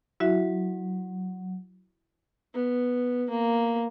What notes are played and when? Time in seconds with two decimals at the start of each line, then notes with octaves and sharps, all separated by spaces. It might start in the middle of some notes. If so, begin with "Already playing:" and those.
0.20 F#3 E4 F#4 E5
2.54 B3
3.30 A#3